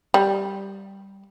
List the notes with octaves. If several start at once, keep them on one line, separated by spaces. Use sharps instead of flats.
G3